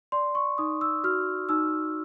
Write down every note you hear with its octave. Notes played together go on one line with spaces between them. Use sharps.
D5 C6
C#6
D#4 D#6
E6
F#4 F6
D#4 E6